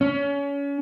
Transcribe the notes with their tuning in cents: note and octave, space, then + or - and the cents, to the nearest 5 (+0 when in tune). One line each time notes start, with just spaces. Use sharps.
C#4 +30